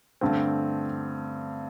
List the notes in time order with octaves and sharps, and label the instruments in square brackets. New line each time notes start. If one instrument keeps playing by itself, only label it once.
[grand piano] G2 D3 A3 C4